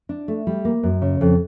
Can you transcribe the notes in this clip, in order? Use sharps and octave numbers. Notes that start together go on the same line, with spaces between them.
D4
A3
G3
A#3
F#2
C#3
F2